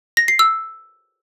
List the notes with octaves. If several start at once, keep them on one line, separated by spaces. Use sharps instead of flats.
A#6
C7
E6